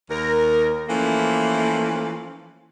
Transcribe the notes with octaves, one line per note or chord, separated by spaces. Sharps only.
D#2 A#4
E3 F3 A3 A#3 C#4